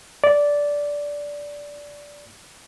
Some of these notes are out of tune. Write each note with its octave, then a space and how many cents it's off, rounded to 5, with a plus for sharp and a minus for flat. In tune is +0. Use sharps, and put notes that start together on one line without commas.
D5 -10